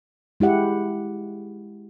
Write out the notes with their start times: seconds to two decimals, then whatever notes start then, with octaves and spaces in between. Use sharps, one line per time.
0.40 G#3 E4 G4 F#5